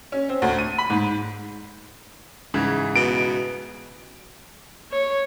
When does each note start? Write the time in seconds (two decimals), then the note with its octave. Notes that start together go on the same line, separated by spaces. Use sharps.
0.12 C#4
0.29 C4
0.42 D2
0.58 D#7
0.78 B5
0.90 G#2
2.54 G#2 C#3 E3
2.96 B2 D7
4.91 C#5